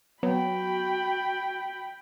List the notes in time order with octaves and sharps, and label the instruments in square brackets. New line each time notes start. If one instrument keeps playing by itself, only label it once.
[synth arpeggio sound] F#3 B3 [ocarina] F#4 [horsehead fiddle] G5 B5